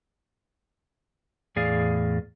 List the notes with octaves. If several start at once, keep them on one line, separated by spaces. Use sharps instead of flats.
E2 A2 G#4 D5 F5